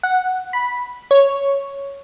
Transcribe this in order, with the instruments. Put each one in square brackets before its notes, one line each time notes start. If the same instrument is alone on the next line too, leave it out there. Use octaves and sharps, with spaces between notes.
[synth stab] F#5
B5
C#5